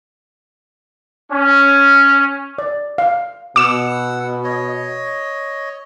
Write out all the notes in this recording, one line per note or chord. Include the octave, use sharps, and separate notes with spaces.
C#4
D5
F5
B2 F#5 D6 E6 E7
C#5 D#5